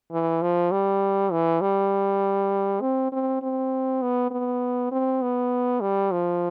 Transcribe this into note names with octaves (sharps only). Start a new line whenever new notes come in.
E3
F3
G3
E3
G3
C4
C4
C4
B3
B3
C4
B3
G3
F3